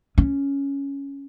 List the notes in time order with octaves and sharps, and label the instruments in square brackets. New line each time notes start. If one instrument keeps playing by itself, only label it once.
[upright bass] C#4